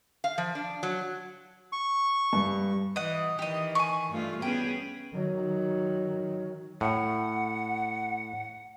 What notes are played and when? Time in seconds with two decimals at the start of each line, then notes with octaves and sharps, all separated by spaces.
0.24 F5
0.38 F3
0.55 D4
0.83 F#3
1.72 C#6
2.33 G2
2.96 E3 D#5 F#5
3.39 D#3 E3 G4 D#5
3.75 G#5 C#6
4.10 G2 A3 F4
4.42 B3 C#4 G#4 G5
5.13 D#3 F#3
6.81 A2 F#5